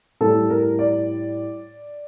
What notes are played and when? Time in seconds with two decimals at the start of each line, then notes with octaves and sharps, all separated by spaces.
0.21 A2 G3 A4
0.50 A#4
0.79 D5